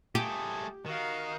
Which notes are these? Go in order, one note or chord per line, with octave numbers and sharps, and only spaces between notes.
A3 G4 G#4
D#3 F#4 F5